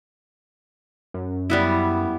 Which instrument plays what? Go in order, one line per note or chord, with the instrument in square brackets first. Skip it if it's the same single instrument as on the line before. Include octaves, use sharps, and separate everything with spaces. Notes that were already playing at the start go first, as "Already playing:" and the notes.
[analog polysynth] F#2
[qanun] G3 B3 E4